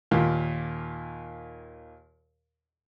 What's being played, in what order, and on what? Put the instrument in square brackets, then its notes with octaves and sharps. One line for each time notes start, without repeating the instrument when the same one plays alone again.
[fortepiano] D#2 A#2